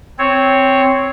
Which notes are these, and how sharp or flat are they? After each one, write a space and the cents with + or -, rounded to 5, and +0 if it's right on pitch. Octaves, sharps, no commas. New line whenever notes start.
C4 +0 C#5 +0